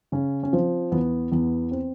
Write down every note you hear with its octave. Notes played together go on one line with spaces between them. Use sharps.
C#3 C#4
C#4
F3 C4
E2 B3
E2 B3
C4